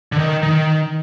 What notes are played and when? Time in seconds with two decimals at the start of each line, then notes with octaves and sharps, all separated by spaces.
0.12 D3
0.17 D#3
0.43 D#3